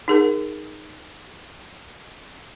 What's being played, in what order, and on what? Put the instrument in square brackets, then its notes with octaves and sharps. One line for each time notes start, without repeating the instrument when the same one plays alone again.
[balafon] D#4 G#4 A#4